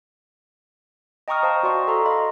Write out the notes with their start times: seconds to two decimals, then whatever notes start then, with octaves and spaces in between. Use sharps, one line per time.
1.28 D#5 G5 A#5 C#6 D#6 F6
1.43 C5 F5 A5
1.63 F#4 D5 C6 C#6
1.88 A4 A#5 C6
2.06 D#5 F5 B5